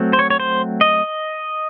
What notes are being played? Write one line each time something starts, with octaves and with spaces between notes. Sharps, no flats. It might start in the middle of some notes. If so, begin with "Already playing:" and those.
Already playing: F#3 A3 C4
C5
C#5
C#5
C5
D#5